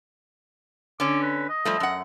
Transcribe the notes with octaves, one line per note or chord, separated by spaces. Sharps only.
D3 C#4 D6
B4
D#5
F3 G3 A3
F#2 F#5